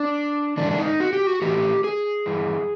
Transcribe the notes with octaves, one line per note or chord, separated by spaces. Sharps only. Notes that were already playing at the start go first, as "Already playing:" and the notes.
Already playing: D4
G#2 E3 D4
D4
D#4
F#4
G4
F#4
A2 E3 G4
G#4
G2 E3